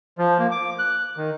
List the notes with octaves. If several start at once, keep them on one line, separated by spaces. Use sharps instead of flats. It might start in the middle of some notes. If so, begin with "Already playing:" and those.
F3
A#3
D6
F#6
D#3